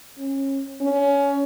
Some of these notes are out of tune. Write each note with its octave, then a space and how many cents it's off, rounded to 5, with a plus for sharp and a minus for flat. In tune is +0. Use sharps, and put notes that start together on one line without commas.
C#4 -30
C#4 +20